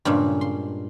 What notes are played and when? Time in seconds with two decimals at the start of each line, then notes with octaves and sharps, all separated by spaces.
0.05 G2 A#2 C#3 G#3
0.41 C6